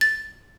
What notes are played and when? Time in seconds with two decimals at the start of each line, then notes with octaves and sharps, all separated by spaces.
0.01 A6